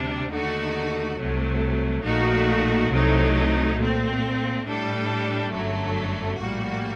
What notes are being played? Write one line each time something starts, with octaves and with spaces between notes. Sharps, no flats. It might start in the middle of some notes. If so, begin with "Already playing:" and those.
Already playing: D2 C3 G3 D4
D#2 D3 A3 D#4 F#4
C2 C3 F#3 A3
A#1 A#2 A3 D#4 F#4
C2 C3 F#3 A3 D#4
A#2 A3 C4
A2 G3 D4 A4
G1 F#2 D3 F#3 A3
A#1 A2 G3 A#3 F#4